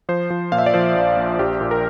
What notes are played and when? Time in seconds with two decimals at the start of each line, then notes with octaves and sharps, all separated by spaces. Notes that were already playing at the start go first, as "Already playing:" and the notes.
0.09 F3 C5
0.30 F3
0.52 A#2 F5
0.58 E5
0.66 D5
0.74 F3 C5
0.95 A#1
1.17 A#1
1.39 A#1 G4
1.61 A#2
1.71 A#4